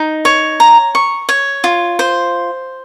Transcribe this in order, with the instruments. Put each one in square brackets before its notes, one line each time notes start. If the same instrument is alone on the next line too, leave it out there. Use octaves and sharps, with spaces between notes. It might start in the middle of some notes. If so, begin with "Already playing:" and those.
Already playing: [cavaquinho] D#4
C#5
A#5
C#6
C#5
F4
C5